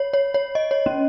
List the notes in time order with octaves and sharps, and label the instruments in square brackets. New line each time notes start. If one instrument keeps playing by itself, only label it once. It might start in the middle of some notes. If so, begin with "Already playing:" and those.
Already playing: [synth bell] C#5
C#5
C#5
D#5
C#5
C#4